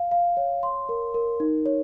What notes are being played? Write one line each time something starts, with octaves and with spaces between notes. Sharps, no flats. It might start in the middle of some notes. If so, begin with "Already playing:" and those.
Already playing: F5
F5
C#5
C6
A#4
A#4
D#4
C#5